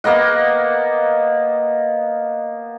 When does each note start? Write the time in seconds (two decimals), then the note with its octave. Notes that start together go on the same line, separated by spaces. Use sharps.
0.04 A#3 B3 D#5 F#5